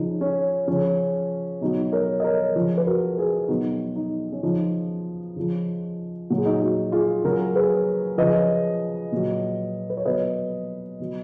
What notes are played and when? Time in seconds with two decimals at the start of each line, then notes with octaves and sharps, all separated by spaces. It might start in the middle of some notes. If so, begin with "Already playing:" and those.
Already playing: C#3 F3 D#4
0.21 C#4
0.68 C#3 F3 C#4
1.61 B2 F#3 D#4
1.92 A#4 C#5
2.20 D#5
2.24 A#4 C#5
2.56 C#3 F3
2.77 B4
2.87 F#4 A#4
3.18 G#4 B4
3.48 B2 F#3 D#4 F#4
3.96 D#4
4.32 C#4
4.43 C#3 F3 D#4
5.36 C#3 F3
6.30 A#2 F#3 F#4
6.38 G#4
6.45 D#4 F#4
6.62 D#4 F#4
6.92 F4 G#4
7.24 C#3 F#3 F#4 A#4
7.56 G#4 B4
8.18 C#3 F3 B4 D#5
9.12 A#2 F#3
9.90 B4
9.97 C#5
10.05 B2 F#3 B4 D#5
10.99 B2 F#3